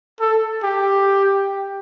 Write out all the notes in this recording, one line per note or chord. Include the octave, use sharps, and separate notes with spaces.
A4
G4